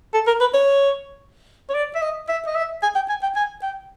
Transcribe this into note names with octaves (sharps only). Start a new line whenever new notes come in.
A4
A#4
B4
C#5
C#5
D5
E5
D#5
E5
D#5
E5
G#5
G5
G#5
G5
G#5
G5